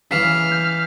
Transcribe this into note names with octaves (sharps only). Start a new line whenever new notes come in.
C#3 E3 F6 B6 C7 E7
G6